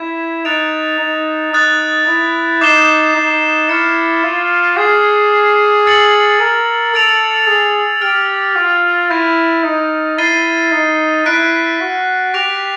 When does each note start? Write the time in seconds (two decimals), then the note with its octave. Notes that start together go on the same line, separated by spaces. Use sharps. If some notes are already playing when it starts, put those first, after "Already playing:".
Already playing: E4 G#6 B6 E7
0.45 D#4 F#6 A6 D7 F7
0.99 D#4
1.53 D#4 D#6 F#6 A6
2.07 E4
2.61 D#4 D6 G6 C7 E7 G7
3.16 D#4
3.69 E4 C#6 F6 A6 C#7
4.24 F4
4.77 G#4 F6 G#6 C7
5.86 E6 A6 C#7 F#7
6.40 A#4
6.93 A4 E6 A6 D7 F7
7.47 G#4
8.01 G4 F6 A6 D7
8.56 F4
9.10 E4 G6 A#6 D#7
9.64 D#4
10.18 E4 A6 C7 D#7 G7
10.71 D#4
11.26 E4 F#6 B6 D7
11.80 F#4
12.34 G4 F#6 A#6 D7 F7